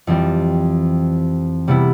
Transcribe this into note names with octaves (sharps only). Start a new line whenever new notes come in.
F2 E3 G3 C4
C3 G3 B3 E4